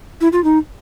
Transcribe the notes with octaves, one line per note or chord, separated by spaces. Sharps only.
E4
F4
D#4